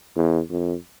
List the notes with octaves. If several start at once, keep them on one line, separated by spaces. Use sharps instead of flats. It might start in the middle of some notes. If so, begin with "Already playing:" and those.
E2
F2